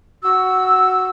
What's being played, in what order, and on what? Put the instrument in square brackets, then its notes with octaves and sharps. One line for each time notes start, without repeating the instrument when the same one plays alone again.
[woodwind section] F#4 E6